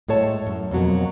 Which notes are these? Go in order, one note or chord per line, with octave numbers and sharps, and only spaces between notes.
A2 G#3 A4 C#5 A5
F#2
F2 B2 F#3 A#3